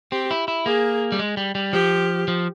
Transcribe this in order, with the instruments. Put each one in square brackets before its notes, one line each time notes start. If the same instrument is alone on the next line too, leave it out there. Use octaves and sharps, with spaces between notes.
[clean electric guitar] C4 [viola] G4
[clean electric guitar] E4
E4
[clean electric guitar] A#3 [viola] G#4
[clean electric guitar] G3
G#3
G3
G3
[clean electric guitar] F3 [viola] G4
[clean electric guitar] F3